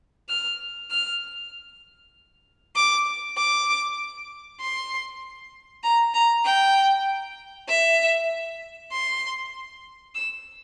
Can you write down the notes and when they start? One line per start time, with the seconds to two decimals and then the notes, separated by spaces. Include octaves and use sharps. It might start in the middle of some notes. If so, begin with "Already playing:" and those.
0.29 F6
0.91 F6
2.75 D6
3.37 D6
4.60 C6
5.84 A#5
6.14 A#5
6.45 G5
7.69 E5
8.92 C6
10.15 E6